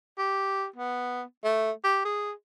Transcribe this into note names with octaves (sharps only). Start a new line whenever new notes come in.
G4
B3
A3
G4
G#4